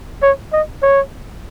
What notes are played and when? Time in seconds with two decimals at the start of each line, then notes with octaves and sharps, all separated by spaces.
0.22 C#5
0.52 D#5
0.82 C#5